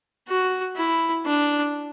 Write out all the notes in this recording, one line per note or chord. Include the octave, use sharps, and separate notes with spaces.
F#4
E4
D4